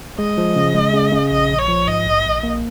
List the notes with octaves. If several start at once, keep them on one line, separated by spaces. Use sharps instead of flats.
G#3 D#5
F3
C#3
G#3
C#3
C#3
A#1 D#5
A#1
C#5
F3
G#2 D#5
A#1
A#1
A#3